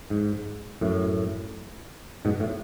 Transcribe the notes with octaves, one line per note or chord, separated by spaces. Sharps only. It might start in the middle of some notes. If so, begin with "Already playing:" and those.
G#2
F#2 A2
G#2 B2
A2